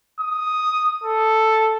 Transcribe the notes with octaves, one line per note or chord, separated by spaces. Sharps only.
D#6
A4